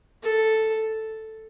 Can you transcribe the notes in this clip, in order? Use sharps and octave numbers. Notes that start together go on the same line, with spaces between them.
A4